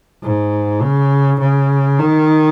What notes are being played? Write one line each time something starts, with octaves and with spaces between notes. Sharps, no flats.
G#2
C#3
C#3
D#3